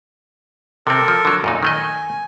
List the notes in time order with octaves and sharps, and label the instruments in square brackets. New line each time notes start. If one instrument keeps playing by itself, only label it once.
[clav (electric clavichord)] C3 C4 [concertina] A4 A#4
[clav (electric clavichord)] F3
D3 F#3
F#2 A#2 D#4
[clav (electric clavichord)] D#3 A3 D#5 [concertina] G#5